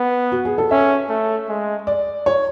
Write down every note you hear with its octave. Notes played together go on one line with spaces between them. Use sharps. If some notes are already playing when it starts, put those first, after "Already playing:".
Already playing: B3
F#4
G#4
A4
C#4 E5
A3
G#3
D5
C#5